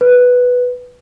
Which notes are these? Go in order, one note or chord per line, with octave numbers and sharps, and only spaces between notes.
B4